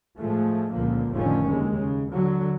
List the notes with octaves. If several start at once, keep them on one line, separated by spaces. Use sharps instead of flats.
A2 F3 G#3 A3
C#2 A#2 D3 F3 A#3
F1 A2 D3 D#3 F3 C#4
D#2 D3 G#3
C#3
D3 F#3